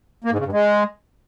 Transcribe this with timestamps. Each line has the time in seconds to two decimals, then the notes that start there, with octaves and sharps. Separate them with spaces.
0.24 A#3
0.31 G#2
0.38 C#3
0.45 G2
0.52 G#3